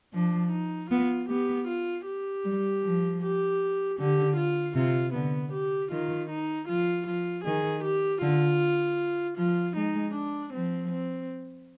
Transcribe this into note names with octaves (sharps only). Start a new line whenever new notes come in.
F3 D4
D#4
B3 F4
B3 G4
F4
G4
G3
F3
G4
D3 G4
F4
C3 F4
D3 B3
G4
D#3 F4
D#4
F3 F4
F3 F4
D#3 G#4
G4
D3 F4
F3 F4
G#3 D#4
D4
F3 C4
C4